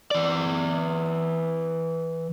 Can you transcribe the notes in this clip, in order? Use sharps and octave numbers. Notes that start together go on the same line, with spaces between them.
E3 D5